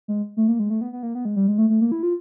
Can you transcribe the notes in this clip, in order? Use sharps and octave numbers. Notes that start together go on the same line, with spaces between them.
G#3
A3
A#3
G#3
A3
B3
B3
A#3
B3
G#3
G3
G#3
A3
A3
A#3
E4
F4